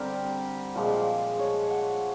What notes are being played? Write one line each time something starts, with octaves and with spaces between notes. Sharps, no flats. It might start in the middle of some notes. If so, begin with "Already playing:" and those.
Already playing: D3 G3 C4 G4 A#4
A#2 F3 G#3
C#5
F#5